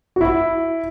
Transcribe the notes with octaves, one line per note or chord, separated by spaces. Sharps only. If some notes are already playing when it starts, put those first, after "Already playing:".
F#4
E4